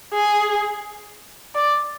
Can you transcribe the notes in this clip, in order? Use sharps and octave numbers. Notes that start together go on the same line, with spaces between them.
G#4
D5